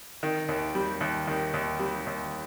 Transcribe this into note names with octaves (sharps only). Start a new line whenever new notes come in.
D#3
D#2
G3
D#2
D#3
D#2
G3
D#2